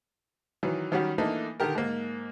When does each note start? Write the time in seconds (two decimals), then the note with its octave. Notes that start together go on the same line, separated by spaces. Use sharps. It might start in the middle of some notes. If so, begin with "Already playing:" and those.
0.63 D#3 E3 F#3
0.92 D#3 F#3 G3 C#4 F#4 G4
1.18 E3 A3 A#3 D4 D#4
1.60 D3 D#3 G4 A#4
1.75 G#2 A#3